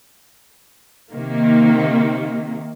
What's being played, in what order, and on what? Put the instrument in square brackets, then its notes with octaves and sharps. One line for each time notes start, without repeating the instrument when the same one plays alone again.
[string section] C3 D#3 A#3